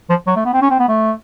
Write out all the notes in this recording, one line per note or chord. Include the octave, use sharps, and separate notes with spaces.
F3
F#3
A3
B3
C4
C#4
C4
B3
A3